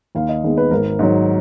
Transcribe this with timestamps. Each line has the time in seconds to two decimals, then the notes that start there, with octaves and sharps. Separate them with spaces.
0.15 D#2 F5
0.29 D#5
0.44 D#3 G#3 B3
0.58 B4
0.71 G#1 A#4
0.99 G#2 F#3